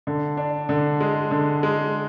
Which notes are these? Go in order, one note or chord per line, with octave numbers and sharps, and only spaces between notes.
D3
D4
D3
G#3
D3
G#3